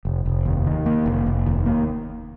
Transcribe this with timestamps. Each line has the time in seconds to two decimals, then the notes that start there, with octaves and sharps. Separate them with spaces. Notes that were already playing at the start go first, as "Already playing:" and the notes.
0.05 F1
0.26 F1
0.45 D#2
0.66 D#3
0.86 A#3
1.06 F1
1.26 F1
1.46 D#2
1.66 A#3